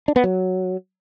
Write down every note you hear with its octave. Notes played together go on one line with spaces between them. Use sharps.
D4
B3
F#3